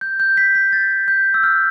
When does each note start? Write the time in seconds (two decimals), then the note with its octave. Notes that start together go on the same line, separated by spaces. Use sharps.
0.01 G6
0.20 G6
0.37 B6
0.55 B6
0.73 A6
1.08 G6
1.34 E6
1.43 F6